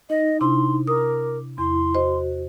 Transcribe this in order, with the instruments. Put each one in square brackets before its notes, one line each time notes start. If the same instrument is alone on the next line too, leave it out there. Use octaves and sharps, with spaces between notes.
[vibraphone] D#4 [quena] D#5
[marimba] C3 D4 E4 [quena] C6
[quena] A#4 [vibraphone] D6 [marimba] D#6
[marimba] E2 [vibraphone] E4 [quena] C6
[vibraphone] F#4 [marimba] C5 D#5